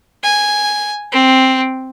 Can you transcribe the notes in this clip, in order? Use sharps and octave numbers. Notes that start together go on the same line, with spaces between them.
G#5
C4